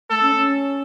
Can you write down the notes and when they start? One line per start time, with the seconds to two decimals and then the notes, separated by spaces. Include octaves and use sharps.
0.10 A3 A4
0.22 C#4
0.35 C#4